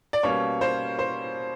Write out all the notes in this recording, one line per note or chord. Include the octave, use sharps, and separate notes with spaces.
D5
B2 G3 A#3 C#4 C#5
C5
C5